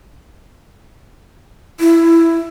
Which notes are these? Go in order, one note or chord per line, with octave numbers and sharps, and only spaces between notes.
E4